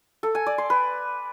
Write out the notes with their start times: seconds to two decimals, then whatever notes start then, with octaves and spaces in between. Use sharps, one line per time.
0.23 A4
0.35 G#5
0.46 D5
0.58 C6
0.70 B4